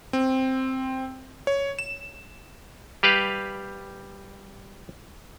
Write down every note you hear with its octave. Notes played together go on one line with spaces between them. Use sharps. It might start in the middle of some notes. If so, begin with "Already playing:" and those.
C4
C#5
E7
G3 G4 B4 F5